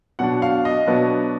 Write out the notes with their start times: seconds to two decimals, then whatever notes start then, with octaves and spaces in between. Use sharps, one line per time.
0.19 B2 F#3 D4 F#5
0.42 F5
0.65 D#5
0.87 B2 F#3 B3 D4